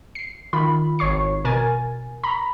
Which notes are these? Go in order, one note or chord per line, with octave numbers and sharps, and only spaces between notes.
C7
D#3 F4 B5
G#1 C#5 C#6 C7
B2 A#4 G#5 A6
A#5 B5